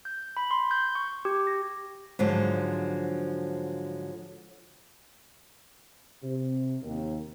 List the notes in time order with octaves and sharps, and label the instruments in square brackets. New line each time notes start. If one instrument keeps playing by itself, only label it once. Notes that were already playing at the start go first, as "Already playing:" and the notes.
[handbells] G6
B5
C6
G6
C#6
G4
A#6
[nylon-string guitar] G#2 D3 F3 F#3
[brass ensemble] C3
D#2